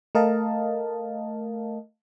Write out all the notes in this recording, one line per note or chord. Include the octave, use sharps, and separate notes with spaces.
A3 A#4 D#5 F5 A5